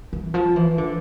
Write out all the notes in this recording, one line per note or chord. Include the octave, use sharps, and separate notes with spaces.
E3
F3
E3
D3